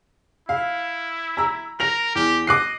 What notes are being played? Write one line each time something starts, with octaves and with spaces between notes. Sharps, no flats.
E4 F5
A#5 E6
A#4 A#6 F7
E2 G4
D#5 D6 F#6 C7